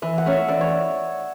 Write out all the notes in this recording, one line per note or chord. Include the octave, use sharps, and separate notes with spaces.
E3 E5
F#5
A3 C#4
E5
E3 D5
C#5